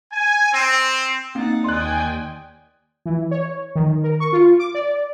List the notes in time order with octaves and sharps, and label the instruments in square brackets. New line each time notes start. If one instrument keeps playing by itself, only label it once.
[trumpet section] G#5
C4
[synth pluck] A#3 C4 [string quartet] D#4 F#5 A6
[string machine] D#2 G5 G#5 [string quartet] D5 D#5 [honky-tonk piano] C6 F#6
[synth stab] E3
C#5
D#3
A#4
C#6
F4
D6
D5